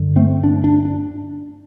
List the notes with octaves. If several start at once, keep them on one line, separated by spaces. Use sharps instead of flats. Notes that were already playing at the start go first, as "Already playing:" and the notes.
Already playing: G2 D3
A3 C4
D4
D4
D4